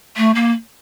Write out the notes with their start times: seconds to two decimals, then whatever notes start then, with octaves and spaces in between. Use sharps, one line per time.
0.17 A3
0.35 A#3